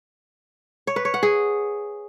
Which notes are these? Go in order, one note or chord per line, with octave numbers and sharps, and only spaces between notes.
C#5
B4
C#5
F#5
G#4